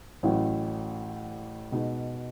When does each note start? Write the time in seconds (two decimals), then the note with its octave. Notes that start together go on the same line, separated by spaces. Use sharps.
0.23 A1 A2 F#3 C#4 E4
1.72 B2 G#3 D#4